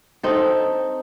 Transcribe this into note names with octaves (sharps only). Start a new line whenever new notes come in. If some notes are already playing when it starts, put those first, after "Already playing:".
C4 D#4 A4